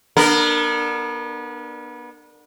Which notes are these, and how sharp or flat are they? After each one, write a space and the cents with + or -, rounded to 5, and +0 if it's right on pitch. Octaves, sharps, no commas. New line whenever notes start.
B3 -30 D4 +30 A#4 -15